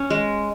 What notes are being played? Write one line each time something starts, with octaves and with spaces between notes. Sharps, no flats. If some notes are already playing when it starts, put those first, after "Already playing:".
Already playing: C#4
G#3